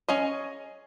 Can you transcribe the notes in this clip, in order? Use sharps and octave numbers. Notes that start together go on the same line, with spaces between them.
C#4 G#4 D#5